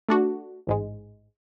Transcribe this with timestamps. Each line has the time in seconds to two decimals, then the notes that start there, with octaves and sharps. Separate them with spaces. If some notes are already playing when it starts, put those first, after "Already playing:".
0.09 A3 D4 F#4
0.67 A1 G#2 G#3